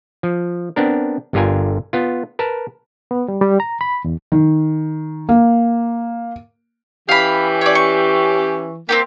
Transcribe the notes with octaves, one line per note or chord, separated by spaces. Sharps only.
F3
B3 C4 D4 A#4
G1 G2 D3 F4 A#4 G#5
B3 F4
A#4 B4 A5
B3
G3
G3
A#5
B5
E2
D#3
A#3
E3 C#4 G4 F5 B5
C#5 D5
C#6
A#3 C4 F#4 G4